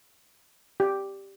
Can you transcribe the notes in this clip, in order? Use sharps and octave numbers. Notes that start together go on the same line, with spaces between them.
G4